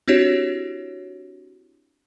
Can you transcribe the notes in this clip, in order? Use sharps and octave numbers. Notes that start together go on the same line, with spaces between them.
C4 D4 E4 F#4 G4 C#5